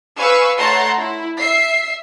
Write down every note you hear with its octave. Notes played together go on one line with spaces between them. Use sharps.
B4 F5 G#5 C#6 E6
A3 C#5 F#5 A5 A#5 C6
E4
E5 C7